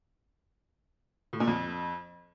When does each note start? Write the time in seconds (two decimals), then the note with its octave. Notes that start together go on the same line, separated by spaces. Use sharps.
1.33 A2
1.40 A#2
1.47 F2